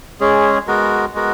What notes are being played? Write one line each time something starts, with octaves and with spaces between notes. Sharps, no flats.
G#3 C#4 G#4
G#3 B3 F#4 A#4
G#3 B3 F#4 A#4